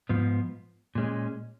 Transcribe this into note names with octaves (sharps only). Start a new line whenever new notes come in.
G#2 F3 B3
A#2 G#3 C#4